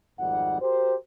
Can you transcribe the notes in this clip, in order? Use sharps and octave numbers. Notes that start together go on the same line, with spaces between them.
G#1 F2 G3 D#4 F#5
F#4 G4 A#4 C5